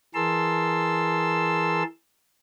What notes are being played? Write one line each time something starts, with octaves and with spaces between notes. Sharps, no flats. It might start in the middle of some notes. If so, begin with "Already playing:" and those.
E3 G#4 A#4 A5 C6 E6